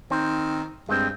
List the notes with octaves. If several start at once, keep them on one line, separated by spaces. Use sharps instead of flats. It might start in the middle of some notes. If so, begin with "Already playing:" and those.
D#3 C4
G2 G#3 C4